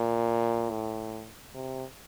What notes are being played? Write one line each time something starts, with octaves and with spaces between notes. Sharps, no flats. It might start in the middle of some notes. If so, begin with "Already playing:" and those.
Already playing: A#2
A2
C3